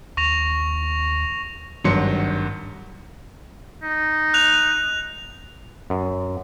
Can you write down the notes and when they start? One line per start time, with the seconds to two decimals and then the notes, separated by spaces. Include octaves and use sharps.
0.17 D#2 C#6 A#6 F7
1.84 G#1 G2 F#3 C6 C#7
3.83 D#4
4.34 F#6 F7
5.90 F#2